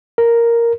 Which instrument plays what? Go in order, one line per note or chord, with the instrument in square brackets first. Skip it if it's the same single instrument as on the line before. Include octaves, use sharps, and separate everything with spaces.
[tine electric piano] A#4